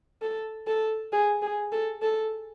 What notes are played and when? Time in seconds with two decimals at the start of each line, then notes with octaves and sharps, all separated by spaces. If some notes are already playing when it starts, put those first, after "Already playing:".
0.22 A4
0.67 A4
1.13 G#4
1.42 G#4
1.72 A4
2.02 A4